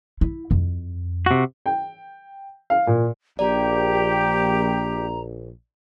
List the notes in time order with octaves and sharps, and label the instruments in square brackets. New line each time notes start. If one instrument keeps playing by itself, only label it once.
[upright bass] E4
F2
[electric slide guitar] C3 F#4
[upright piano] G5
F5
A#2
[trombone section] A#1 [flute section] G4 [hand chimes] D5 [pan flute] A#5